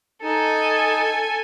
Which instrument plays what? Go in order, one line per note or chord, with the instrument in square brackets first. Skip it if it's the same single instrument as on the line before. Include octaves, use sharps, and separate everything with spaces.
[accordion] D#4 [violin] A4 G#5